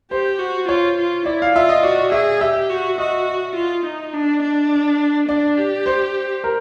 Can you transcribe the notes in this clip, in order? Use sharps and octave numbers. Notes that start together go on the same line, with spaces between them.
G4 C5
F#4
F4 C#5
F4
E4 D5
F5
F4 E5
D#5
F#4 D5
G#4 E5
G4 E5
F#4
F#4 D#5
F4
D#4
D4
D4
D4 D5
G4
C5
A#4